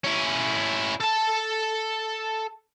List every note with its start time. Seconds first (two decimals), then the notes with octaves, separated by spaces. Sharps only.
0.04 C#4 E4
1.01 A4 A5